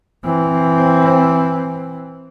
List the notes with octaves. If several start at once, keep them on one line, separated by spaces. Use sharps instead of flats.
E3 C4